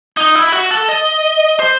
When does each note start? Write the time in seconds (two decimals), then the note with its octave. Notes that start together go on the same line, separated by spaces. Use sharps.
0.17 D#4
0.35 E4
0.52 F#4
0.71 A4
0.89 D#5
1.59 C5